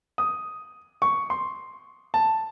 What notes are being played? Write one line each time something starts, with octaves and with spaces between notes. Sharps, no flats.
D#6
C#6
C6
A5